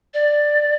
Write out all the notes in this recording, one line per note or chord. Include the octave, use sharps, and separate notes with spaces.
D5